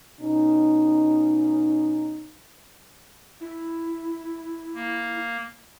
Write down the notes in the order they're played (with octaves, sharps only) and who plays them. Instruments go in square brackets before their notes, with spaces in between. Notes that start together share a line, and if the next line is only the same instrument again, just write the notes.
[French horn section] B2 C#4 D#4
[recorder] E4
[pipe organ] A#3